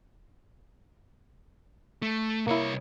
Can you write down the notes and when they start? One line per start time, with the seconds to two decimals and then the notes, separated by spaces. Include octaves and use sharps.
2.02 A3
2.47 C2 A#3 E4 C#5